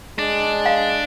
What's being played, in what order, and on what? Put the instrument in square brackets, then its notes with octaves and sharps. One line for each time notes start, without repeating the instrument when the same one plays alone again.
[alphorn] G#3 [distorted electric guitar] D4
[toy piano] F5